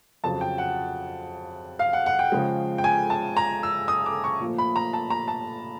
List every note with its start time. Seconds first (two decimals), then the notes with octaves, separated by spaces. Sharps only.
0.24 F2 C#3 F#3 A5
0.41 G5
0.58 F#5
1.79 F5
1.93 F#5
2.06 F#5
2.19 G5
2.32 C#3 F3 G#3
2.78 G5
2.84 G#5
3.10 A5
3.37 A#5
3.63 E6
3.88 D#6
4.06 D6
4.24 C#6
4.40 A#2 F3 A3
4.58 B5
4.76 A#5
4.93 A5
5.10 A#5
5.28 A5